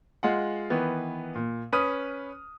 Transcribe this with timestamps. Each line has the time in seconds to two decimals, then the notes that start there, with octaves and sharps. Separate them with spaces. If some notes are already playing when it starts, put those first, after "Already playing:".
0.23 G#3 F4 F#5
0.70 D#3 E3 B3
1.35 A#2
1.72 C#4 B4 D#6 F6 D#7